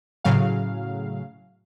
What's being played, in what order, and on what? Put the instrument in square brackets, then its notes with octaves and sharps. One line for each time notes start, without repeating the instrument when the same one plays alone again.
[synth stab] A2 C#3 F#3 F5